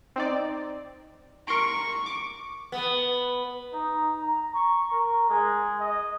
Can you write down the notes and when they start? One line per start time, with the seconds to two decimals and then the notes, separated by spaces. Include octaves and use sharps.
0.16 C4 D#4 D5
1.48 A#4 C6 C#6 D7
2.06 D6
2.72 B3
3.74 D#4
4.19 A#5
4.55 C#6
4.92 A#4
5.29 G#3
5.80 D#5